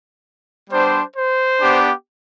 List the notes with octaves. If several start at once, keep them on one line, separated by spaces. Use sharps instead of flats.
G3 B3 D4 C5
C5
B3 D4 G4